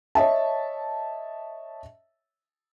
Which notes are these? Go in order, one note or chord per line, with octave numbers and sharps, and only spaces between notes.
C#5 D#5 E5 A5